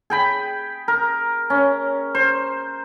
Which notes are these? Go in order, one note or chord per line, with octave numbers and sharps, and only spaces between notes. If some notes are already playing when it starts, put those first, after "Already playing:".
G#4 G5 B5
A#4
C#4
C5